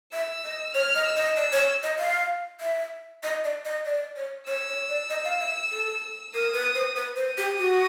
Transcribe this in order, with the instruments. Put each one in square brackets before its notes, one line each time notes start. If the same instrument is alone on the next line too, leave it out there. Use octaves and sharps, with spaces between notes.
[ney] E5 [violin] E6
[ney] D#5
[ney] C#5 [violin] F6
[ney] D#5
[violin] E6
[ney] D#5
[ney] D5 [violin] E6
[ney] C#5
D#5
F5
E5
D#5
D5
D#5
D5
C#5
[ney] C#5 [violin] E6
[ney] C#5
D5
D#5
F5
E5
A4
[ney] A#4 [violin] D#6
[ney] B4
C5
B4
C5
[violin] D#6
[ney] G4
F#4